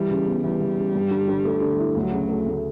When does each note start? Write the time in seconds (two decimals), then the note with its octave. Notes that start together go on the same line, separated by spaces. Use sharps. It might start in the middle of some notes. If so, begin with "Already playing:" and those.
Already playing: E3 G3
0.10 C#3
0.26 B3
0.44 E3 G3
0.60 E3
0.77 C#3
0.95 G2
1.11 D3
1.28 D3
1.45 A3
1.61 D3
1.79 E4
1.95 D2 F#3
2.12 C#3
2.29 A3
2.46 D2